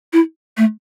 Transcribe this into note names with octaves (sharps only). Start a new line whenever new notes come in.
E4
A3